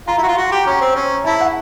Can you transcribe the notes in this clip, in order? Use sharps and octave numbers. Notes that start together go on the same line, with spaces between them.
F4 A#5
E4
F#4
F4
F#4
G4
C#4 A#5
C4
C#4
E4 A5
F#5